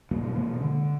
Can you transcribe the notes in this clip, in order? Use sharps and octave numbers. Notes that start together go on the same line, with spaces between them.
G#2 B2 G3 A#3
B2 E3 G#3 A#3
D3